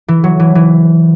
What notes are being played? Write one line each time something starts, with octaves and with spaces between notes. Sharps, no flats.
E3
F#3
E3
E3